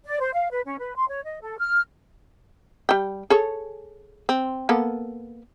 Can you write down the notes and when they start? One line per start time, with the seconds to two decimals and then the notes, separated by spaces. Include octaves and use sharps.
0.05 D5
0.20 C5
0.33 F5
0.50 B4
0.66 C#4
0.79 B4
0.96 C6
1.09 C#5
1.24 D#5
1.42 A4
1.58 F6
2.89 G3 G5
3.30 G#4 A4 C#5
4.29 C4
4.69 A#3 B3 A4